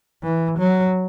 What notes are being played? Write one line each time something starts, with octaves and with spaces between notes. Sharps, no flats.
E3
F#3